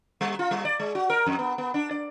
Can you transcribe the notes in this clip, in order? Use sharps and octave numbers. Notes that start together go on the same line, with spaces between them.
G3
F4
G3
D5
G#3
F#4
A#4
F2
B3
B3
D4
D5